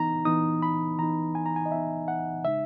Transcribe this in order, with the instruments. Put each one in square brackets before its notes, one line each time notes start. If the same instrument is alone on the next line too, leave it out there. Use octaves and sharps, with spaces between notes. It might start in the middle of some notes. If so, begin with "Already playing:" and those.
Already playing: [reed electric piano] E3 B3 D#4 A#5
E3 B3 D#4 D#6
B5
E3 B3 D#4 A#5
G#5
A#5
G#5
D#5
E3 B3 D#4 E5
F#5
C#3 G#3 D#4 E5